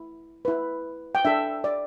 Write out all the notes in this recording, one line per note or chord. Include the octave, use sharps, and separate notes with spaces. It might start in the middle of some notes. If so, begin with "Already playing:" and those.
Already playing: E4
E4 B4
G5
D4 A4 E5
D5